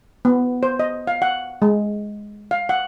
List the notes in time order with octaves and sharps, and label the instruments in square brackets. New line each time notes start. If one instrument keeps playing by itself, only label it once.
[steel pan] B3
C5
D#5
F5
F#5
G#3
F5
F#5